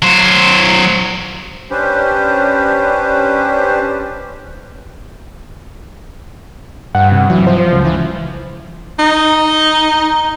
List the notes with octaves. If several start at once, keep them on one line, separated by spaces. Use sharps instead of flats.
F#3 C5
C#4 D4 G4 B4 C5
G2 F#5
C3
E3 F#3
F3 C5
C#2
E3
D#4